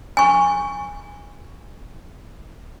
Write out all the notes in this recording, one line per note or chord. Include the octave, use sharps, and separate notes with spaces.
G#5 C#6